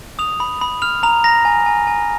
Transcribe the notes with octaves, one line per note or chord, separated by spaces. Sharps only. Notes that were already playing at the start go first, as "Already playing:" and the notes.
D#6 F7
B5
B5
F6 F7
A#5 F7
A#5 A#6
G#5
G#5
G#5